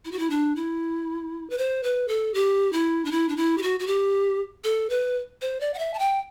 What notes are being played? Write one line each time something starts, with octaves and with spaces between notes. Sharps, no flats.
E4
F#4
E4
D4
E4
B4
C5
B4
A4
G4
E4
D4
E4
D4
E4
G4
F#4
F#4
G4
A4
B4
C5
D5
F#5
E5
A5
G5